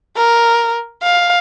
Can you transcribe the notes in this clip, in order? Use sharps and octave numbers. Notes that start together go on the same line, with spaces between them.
A#4
F5